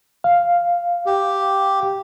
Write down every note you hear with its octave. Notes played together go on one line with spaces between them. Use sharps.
F5
G4